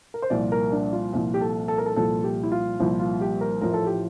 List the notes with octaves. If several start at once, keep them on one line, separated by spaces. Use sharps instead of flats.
A#4
C5
C2 A#2 F3 D5
A#4
D4
F4
C2 A#2 F3
G4
A4
A4
A#4
A4
C2 A#2 F3 A4
G4
E4
F4
C2 A#2 F3 E4
F4
G4
A#4
A1 A2 F3 A#4
A4
G4